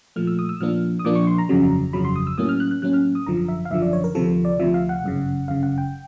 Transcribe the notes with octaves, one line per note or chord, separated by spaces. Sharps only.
A#2 F3 A3 F6
E6
D#6
E6
A#2 F3 A#3 D4 F6
D#6
A#2 F3 A#3 D4 D6
C#6
C6
A#5
G1 F2 C#3 F#3
G1 F2 C#3 F#3 B5
C6
D#6
E6
A2 F#3 A#3 C#4 D#6
F6
F#6
F#6
A2 F#3 A#3 C#4 F#6
F6
D#6
G#1 F#2 D3 F3 A#5
E5
F5
G#1 F#2 D3 F3 E5
D5
C#5
A#4
D2 C3 F3 A4
D5
D2 C3 F3 E5
F5
F#5
G1 F#2 C#3
G1 F#2 C#3 F5
F#5
G5